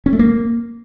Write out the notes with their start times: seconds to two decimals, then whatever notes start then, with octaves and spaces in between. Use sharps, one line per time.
0.06 C#4
0.13 A3
0.19 A#3